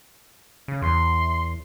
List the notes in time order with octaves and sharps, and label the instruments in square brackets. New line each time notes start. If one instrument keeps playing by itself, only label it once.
[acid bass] C#3
[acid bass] E2 [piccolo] C6